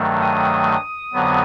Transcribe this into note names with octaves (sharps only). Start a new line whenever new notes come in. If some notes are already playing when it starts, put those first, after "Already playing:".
Already playing: G2 D#3 F#3 A3
D#6
F2 D3 F#3 B3